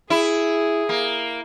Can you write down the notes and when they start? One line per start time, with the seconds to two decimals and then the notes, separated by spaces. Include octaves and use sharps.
0.10 E4 G#4
0.89 A#3